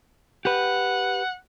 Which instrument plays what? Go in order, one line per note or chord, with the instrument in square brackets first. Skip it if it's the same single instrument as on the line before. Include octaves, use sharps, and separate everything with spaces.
[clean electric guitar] G4 B4 [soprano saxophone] F#5